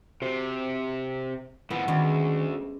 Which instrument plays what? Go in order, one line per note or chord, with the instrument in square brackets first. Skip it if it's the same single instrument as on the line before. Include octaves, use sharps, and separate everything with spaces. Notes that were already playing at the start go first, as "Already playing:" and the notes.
[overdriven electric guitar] C3 [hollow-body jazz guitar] F#4 A4 C5
[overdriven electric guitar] A2 F3 [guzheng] B3
[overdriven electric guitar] D2 [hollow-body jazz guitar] D#3 [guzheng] G3 G#3 C#4